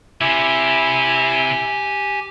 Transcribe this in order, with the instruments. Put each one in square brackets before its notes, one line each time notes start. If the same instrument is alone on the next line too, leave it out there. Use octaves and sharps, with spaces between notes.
[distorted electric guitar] C3 [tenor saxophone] E4 [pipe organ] G4 G#5